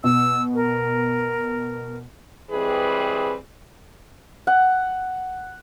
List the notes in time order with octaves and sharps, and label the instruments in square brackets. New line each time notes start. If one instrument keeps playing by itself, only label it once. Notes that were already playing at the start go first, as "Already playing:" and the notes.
[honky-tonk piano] B2 [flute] E6
[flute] A#4
[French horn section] E3 G3 G#3 C4 G#4 B4
[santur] F#5